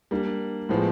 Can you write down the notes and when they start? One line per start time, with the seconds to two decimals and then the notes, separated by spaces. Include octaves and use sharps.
0.11 G3 A#3 D4
0.69 A2 F3 G#3 B3